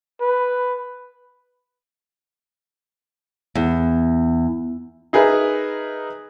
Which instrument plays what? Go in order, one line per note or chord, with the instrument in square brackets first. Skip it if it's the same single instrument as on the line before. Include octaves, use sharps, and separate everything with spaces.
[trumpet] B4
[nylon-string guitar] E2
[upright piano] D#4 G#4 A#4 B4 E5